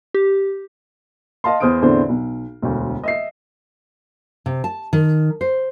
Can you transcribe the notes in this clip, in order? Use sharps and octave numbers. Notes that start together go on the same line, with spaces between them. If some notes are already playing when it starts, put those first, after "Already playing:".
G4
D#5 F5 A5 C6
E2 C5 D#6 F6 D7
E2 A2 D3 C4 D4 C5
B1
E1 D2
D#5 E5 C7
C3
A5
D#3
C5